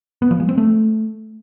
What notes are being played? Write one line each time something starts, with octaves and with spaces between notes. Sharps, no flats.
B3
F3
G#3
C4
A3